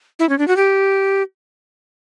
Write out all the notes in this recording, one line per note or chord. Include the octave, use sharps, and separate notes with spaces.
E4
C#4
D4
F#4
G4